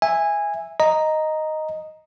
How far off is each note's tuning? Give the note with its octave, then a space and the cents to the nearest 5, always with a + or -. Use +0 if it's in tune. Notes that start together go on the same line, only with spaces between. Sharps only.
E5 +0 G#5 -15
D#5 +0 A#5 +0